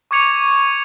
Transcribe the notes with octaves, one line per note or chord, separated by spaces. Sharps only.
C#6 D6 G#6 C#7 F7